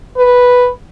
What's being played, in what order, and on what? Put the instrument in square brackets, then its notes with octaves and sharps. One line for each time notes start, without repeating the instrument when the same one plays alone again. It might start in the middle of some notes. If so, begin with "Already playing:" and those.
[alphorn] B4